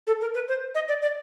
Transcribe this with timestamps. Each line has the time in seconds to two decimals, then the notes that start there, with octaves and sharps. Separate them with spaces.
0.07 A4
0.21 A#4
0.35 B4
0.48 C5
0.75 D#5
0.88 D5
1.02 D5